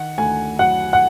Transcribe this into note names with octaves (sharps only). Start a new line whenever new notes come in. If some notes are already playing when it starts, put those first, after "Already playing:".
Already playing: D#3 F#5
D2 G#5
F#3 F#5
F#5